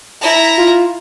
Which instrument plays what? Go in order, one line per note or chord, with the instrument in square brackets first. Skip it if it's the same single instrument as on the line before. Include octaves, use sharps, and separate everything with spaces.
[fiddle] E4 A#5
[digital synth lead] F4